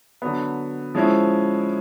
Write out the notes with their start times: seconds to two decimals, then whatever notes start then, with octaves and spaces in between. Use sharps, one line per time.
0.22 D3 F#3 B3
0.95 F3 G#3 C#4 E4